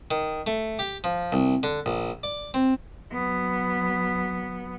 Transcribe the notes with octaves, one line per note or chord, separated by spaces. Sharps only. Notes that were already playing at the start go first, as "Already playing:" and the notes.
D#3
A3
G4
F3
C2
D3
A#1
D5
C4
F#3 B3